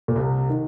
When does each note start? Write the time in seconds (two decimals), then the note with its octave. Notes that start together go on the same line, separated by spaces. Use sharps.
0.08 A#2
0.16 C2 C3
0.50 D#3